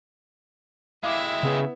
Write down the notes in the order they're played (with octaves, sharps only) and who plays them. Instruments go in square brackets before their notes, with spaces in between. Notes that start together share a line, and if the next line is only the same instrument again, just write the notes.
[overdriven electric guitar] G#3 G4 [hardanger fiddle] E4 E5 [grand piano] F5 D6
[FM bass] C#3 [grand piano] B3